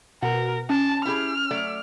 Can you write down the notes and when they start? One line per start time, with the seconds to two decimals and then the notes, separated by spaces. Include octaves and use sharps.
0.23 B2 A#4 F#5
0.70 C#4 A5
1.05 E4 G4 G#4 F6
1.51 F#3 A3 D5